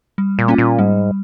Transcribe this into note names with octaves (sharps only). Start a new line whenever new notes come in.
G3
A#2
A#3 C#4 F4
A#2
G#2 G3